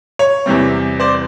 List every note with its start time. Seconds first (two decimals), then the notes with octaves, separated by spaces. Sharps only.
0.19 C#5
0.46 E2 C3 E3 G3 C4
1.00 C5 D5